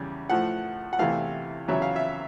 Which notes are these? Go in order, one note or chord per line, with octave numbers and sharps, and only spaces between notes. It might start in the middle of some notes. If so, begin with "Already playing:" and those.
Already playing: E2 C#3 G3
A2 F3 A3 F#5
F#5
E2 C3 E3 A3 F5
E2 C#3 F#3 E5
F5
E5